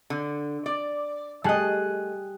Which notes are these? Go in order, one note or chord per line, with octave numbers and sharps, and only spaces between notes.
D3
D5
G3 A3 G#4 D#5 F#6